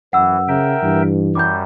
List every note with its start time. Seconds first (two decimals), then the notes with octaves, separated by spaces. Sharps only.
0.13 F#2 E3 F#5 E6
0.48 C#3 A#4 E5 G5
0.83 G2 E3
1.35 F#2 G3 D6 G6